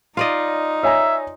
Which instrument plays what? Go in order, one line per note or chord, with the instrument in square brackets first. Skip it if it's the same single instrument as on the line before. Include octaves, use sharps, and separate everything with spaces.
[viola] D#4 [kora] F4 D5 D#5
[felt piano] C#5 G#5 A#5 [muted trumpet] E5